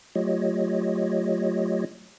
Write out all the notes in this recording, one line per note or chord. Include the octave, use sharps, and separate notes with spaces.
F#3 A3 F4 G4 C#5 D#5